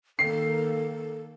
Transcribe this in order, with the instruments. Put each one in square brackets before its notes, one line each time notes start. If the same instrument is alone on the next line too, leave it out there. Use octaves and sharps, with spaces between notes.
[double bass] D#3 A#3 [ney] A4 [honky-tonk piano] C7